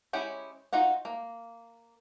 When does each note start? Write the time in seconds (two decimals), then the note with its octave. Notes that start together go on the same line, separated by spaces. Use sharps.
0.13 G#3 C#4 E4 G4 C#5
0.73 D#4 F4 F#4 F#5
1.05 A#3